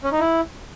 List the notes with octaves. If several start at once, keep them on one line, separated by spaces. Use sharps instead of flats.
C#4
D#4
E4